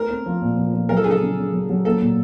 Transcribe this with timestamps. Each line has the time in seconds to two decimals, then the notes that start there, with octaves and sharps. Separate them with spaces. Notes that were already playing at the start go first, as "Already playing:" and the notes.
Already playing: A3 A#4
0.10 C4
0.26 F3
0.42 A#2
0.57 F3
0.74 F3
0.89 F#3 A#4
0.97 A4
1.04 C#3 G#4
1.11 A4
1.21 C#3
1.38 C#3
1.53 F#3
1.69 F#3
1.85 A#3 A4
2.02 A#2